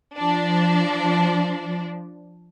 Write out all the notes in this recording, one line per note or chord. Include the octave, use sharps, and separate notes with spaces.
F3 D4